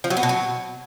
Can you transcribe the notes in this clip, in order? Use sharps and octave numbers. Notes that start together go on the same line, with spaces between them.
F3
F#3
B3
B2
F#3